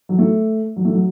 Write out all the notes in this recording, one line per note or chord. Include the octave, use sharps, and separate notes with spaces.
F#3
A3
F#3
A3
F#3